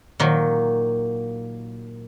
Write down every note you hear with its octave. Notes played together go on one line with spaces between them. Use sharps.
A#2 D#3 F#3